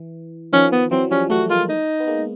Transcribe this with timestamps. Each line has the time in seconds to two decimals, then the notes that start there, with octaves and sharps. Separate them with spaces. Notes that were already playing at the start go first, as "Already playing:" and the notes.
Already playing: E3
0.53 D#3 F3 C#4
0.72 B3
0.91 E3 F#3 C4
1.11 F3 G3 C#4
1.30 G3 A3 F#4
1.49 G#3 A#3 F4
1.69 D#4
2.00 B3
2.07 G#3 A#3